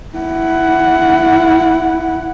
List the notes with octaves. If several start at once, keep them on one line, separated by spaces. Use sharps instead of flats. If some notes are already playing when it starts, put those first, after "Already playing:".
E4 F#5